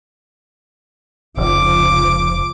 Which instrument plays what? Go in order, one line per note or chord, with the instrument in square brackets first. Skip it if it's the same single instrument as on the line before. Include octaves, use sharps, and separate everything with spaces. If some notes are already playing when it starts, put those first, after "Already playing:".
[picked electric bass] F1 [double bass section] C#2 F3 [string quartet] D6